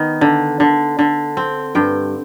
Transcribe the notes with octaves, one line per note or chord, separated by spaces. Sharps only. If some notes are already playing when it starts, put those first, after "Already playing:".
Already playing: D#3 B3
D3
D3
D3
C4
G2 G5